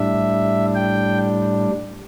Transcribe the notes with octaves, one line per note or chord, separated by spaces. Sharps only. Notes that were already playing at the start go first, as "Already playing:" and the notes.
Already playing: A2 G3 D4 E5
G5